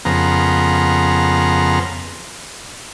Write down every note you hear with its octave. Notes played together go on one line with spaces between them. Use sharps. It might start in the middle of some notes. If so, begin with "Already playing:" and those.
F2 C#3 B3 A#4 A#5 C6